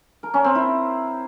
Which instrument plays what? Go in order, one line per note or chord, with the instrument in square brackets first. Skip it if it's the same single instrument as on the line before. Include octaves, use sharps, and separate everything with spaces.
[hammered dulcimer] A#4
C#4
C4
E4